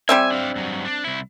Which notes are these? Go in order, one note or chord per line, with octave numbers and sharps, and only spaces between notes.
G3 C4 E5 G#5
D4 F5
G2 F#3
D4
C2 E4